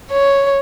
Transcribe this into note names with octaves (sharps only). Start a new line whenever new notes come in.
C#5